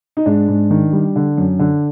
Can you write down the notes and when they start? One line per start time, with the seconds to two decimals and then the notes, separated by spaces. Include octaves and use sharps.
0.17 D#4
0.26 G#2 D4
0.48 G#2
0.71 D#3
0.93 G3
1.16 D3
1.38 F#2
1.59 D3